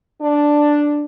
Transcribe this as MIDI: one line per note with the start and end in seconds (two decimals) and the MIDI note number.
0.22 1.05 62